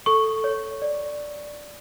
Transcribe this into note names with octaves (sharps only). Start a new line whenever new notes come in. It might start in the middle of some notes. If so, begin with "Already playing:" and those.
A4 C#6
C#5
D5